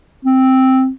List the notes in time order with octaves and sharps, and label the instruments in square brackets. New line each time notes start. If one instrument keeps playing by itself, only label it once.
[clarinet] C4